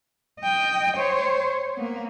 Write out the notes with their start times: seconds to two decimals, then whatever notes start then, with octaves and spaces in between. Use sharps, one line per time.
0.41 D#5 G5
0.97 C5 C#5
1.77 A#3 B3